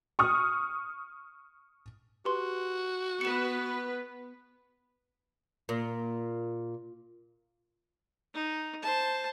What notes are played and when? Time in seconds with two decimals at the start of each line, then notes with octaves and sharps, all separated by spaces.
0.19 C#6 D#6 F6
2.25 F#4 G4 B4 C6
3.21 B3 B4 C#7 E7
5.69 A#2
8.34 D#4
8.83 C5 A5